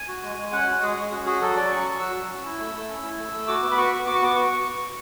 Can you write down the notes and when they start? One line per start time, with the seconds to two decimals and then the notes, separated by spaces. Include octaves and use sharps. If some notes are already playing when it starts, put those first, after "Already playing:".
Already playing: G#5
0.08 F#4
0.23 G#3
0.37 G#3
0.52 C#4 F#5
0.67 F#4
0.81 G#3 G#4
0.96 G#3
1.12 C#4 F#4
1.26 F#4 G#4
1.41 F#3 A4
1.56 F#3 D5
1.70 C#4 C#6
1.86 F#4
2.00 F#3 E6
2.15 F#3
2.29 C#4
2.45 E4
2.59 A3
2.74 A3
2.88 C#4
3.03 E4
3.18 A3
3.33 A3
3.47 F#4 D6
3.62 B3
3.71 B5
3.77 F#4 C#6
3.91 B3
4.06 F#4 D6
4.15 C#6
4.22 B3 D6
4.36 F#4 C#6